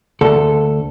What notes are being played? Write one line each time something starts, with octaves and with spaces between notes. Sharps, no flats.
D2 A4